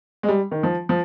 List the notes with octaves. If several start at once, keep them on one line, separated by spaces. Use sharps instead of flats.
G#3
G3
D#3
F3
F3